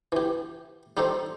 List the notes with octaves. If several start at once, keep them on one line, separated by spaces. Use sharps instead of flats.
E3 G4
G3 D#4 G4 A4 C5